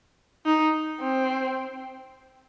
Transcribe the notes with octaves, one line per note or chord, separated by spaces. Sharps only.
D#4
C4